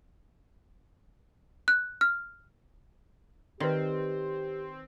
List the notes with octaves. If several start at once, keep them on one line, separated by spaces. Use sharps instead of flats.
F#6
F6
D#3 C4 G4 B4 D5